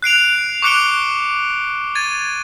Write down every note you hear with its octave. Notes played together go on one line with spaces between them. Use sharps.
F#6 C7 D7 F7
C#6 D6 F#6 C#7 D7 G7
G#6 A6 D#7